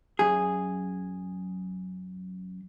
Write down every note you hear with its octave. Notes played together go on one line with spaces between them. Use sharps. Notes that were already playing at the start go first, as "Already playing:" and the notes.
F#2 G#4